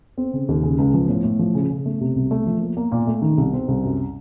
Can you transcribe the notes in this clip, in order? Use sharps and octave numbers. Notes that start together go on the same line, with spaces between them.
C4
C#3
D#2
C#3
C#2
F3
A2
A2
F3
C#3
C#3
A3
C3
C2
A3
F3
A#3
A#3
A#2
A3
D#3
C2
C4
C2
F#2